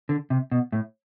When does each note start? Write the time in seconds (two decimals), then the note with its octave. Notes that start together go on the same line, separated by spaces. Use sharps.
0.09 D3
0.30 C3
0.52 B2
0.73 A2